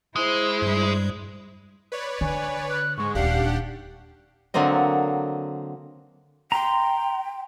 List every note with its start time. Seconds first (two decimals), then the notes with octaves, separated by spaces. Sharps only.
0.16 G#3 E4 C5
0.62 G2 G3
1.92 B4 C#5 D5
2.21 D3 G#5
2.69 F#6
2.97 G#2 G#3 C#6
3.15 D#1 D4 D#4 G4 F5 F#5
4.54 D3 F#3 A#3 C4 D#5
6.52 G5 A#5 C6